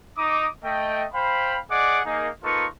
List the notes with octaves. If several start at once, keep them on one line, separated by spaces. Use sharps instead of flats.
D#4 D6 D#6
A3 D#5 G5
C5 F5 G5 B5
G#4 D5 D#5 F#5 D6
A#3 D#4 G#4
A#3 D#4 F4 A4 B4 C#6